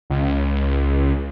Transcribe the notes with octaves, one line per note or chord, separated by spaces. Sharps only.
C#2